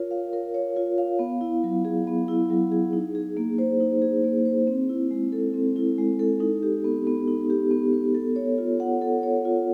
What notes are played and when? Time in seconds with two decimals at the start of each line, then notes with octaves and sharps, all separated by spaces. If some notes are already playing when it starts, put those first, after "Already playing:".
Already playing: F4 A#4 C#5
0.11 F5
0.33 A#4
0.54 C#5
0.76 F4
0.98 F5
1.19 B3
1.41 E4
1.64 F#3
1.85 G#4
2.07 B3
2.28 E4
2.50 F#3
2.72 G#4
2.93 D#4
3.15 G#4
3.37 A#3
3.58 C5
3.80 D#4
4.02 G#4
4.24 A#3
4.45 C5
4.67 C4
4.89 E4
5.11 G#3
5.32 A4
5.54 C4
5.76 E4
5.98 G#3
6.19 A4
6.40 D#4
6.63 G4
6.84 B3
7.07 B3
7.28 D#4
7.50 G4
7.71 B3
7.93 B3
8.15 A4
8.36 C#5
8.58 F4
8.80 F#5
9.01 A4
9.23 C#5
9.45 F4